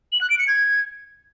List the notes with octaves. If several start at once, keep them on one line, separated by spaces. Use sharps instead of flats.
F#7
F#6
D7
C#7
G#6